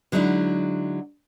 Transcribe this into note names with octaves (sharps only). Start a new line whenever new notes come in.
D3 F#3 G#3 C4 D#4 E4